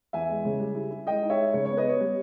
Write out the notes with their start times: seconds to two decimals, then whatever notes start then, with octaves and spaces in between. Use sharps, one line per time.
0.13 E2 E5 G#5
0.29 G#3
0.45 C#3
0.60 G3
0.75 E4
0.91 E4
1.07 G#3 D#5 G5
1.23 D#4
1.30 C#5 E5
1.39 G#3
1.54 C#3 C#5
1.65 B3 C#5
1.77 B4 D#5
1.86 B3 C#5
2.00 G3